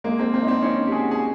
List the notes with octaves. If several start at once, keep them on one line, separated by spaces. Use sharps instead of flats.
G#3 A#3
A#3 C4
A#3 C4
D#4
C4 D4
C#4 D#4
G4
F#4 G#4
G#4